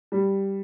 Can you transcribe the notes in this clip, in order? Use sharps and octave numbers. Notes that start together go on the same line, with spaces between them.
G3